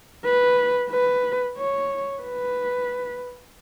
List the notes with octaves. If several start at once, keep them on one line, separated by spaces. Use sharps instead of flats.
B4
B4
C#5
B4